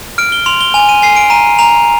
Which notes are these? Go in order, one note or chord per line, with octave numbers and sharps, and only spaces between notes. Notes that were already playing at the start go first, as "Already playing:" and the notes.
F6 D7
G7
C6 F7
G7
G#5 F7
D#7
G#5 C7
D7
A#5 D#7
A#5 F7